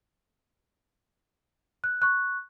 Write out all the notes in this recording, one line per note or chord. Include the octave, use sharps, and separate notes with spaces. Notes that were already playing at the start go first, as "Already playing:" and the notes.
F#6
C#6 F#6